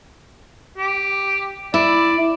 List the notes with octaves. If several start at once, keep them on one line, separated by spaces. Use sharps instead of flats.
G4
E4 D5